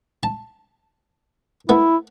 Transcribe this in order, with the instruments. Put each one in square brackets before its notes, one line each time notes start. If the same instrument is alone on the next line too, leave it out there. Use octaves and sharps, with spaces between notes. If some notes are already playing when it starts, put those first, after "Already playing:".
[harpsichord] A5
[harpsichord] A3 B3 [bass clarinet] E4